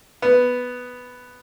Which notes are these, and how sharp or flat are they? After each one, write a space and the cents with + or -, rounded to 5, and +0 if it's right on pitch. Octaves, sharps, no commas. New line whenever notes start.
B3 +5